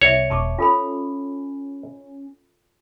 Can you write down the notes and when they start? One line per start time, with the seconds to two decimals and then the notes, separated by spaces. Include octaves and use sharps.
0.02 C2 C#5 D5 E5
0.30 E1 A5 C#6 D6
0.58 C#4 F4 A4 B5